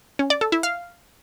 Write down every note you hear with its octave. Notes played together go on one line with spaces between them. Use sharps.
C#4
D5
A4
E4
F5